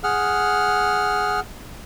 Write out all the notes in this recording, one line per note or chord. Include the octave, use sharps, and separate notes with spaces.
G#4 F#5 F6